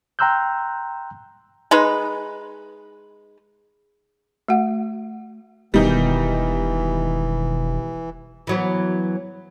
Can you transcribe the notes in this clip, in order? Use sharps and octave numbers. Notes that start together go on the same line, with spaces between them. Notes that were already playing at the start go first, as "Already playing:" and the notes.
G5 A#5 C6 E6 F#6 G6
G#3 D#4 B4
A3 F#4 F#5
E1 B2 D#3 E3 G3 D#4 G4
E3 F#3 B3